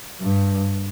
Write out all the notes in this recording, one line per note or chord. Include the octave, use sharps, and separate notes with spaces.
G2